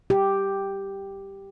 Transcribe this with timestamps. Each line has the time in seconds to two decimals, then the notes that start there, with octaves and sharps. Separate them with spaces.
0.10 G4